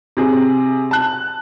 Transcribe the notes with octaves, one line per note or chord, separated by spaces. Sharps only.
C3 G#4
A5 F#6